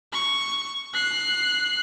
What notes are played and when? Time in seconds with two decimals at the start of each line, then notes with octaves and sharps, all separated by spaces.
0.13 C#6
0.94 F#6 C7